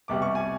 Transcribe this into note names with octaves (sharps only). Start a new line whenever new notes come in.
C2 B2 G3 D6
C#6
G#5